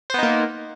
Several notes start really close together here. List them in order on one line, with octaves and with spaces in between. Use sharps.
C5 B3 D#4 A#3